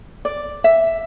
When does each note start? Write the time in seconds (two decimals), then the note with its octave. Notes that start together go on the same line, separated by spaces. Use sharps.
0.25 D5
0.64 E5